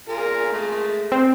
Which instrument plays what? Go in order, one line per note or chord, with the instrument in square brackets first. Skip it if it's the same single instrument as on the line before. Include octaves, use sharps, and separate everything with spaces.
[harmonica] F4 G#4 A#4
G#3 A3
[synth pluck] C4